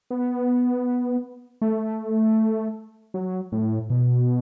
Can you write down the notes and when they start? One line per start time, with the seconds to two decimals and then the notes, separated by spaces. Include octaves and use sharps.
0.11 B3
1.62 A3
3.14 F#3
3.52 A2
3.90 B2